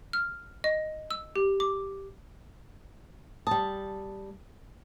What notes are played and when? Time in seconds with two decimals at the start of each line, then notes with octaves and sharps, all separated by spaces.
0.13 F6
0.64 D#5
1.11 E6
1.36 G4
1.60 D6
3.47 G3 A5 D#6